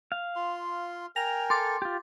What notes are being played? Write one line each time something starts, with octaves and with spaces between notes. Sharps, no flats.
F5
F4 C6
A#4 G5 G#5 A#6 F7
A4 C6 D6 A6
F4 G4